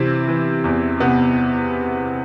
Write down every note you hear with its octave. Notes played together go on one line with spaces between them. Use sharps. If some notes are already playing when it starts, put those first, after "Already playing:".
Already playing: C3 E3 C4 E4
E3
E2
C3 B3